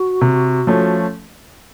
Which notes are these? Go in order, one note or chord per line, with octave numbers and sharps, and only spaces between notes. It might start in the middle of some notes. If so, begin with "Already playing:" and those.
Already playing: F#4
C3
F3 A3 C#4